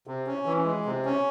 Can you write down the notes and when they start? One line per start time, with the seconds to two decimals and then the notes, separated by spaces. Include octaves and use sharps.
0.07 C3
0.27 C#4
0.46 E3
0.65 G#3
0.86 C3
1.05 C#4